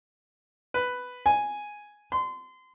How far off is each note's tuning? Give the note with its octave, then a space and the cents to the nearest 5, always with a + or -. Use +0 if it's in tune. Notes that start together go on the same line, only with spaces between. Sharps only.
B4 +5
G#5 +0
C6 -30